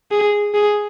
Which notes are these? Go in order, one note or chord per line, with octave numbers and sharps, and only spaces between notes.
G#4
G#4